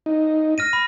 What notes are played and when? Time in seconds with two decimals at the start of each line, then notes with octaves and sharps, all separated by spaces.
0.06 D#4
0.58 F6 A#6 D#7
0.73 B5